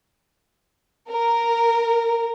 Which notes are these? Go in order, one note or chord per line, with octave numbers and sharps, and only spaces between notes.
A#4